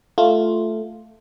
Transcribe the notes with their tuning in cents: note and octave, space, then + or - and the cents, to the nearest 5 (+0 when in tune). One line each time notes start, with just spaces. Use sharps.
A3 +0 F4 +0